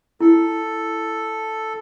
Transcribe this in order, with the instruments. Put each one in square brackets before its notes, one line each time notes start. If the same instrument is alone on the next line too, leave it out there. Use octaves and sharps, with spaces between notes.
[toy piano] E4 [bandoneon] A4